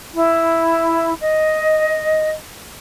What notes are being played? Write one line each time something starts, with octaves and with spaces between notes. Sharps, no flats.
E4
D#5